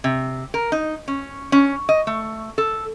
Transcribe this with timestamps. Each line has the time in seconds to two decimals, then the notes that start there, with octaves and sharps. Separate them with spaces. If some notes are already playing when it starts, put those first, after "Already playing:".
0.04 C3
0.54 A#4
0.72 D#4
1.08 C#4
1.52 C#4
1.89 D#5
2.07 A3
2.58 A4